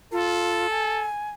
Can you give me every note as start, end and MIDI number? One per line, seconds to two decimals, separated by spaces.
0.12 0.67 65
0.12 1.08 69
0.70 1.30 80